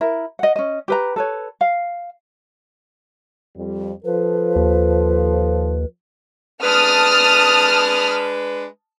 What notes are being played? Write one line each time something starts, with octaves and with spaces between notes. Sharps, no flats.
E4 A#4
D#5 F#5
C#4 D#5
G4 B4 A#5
A4 B4 C#5
F5
F2 G3
F3 A4 B4
D#2
G#3 D4 B4 A5 D#6 F6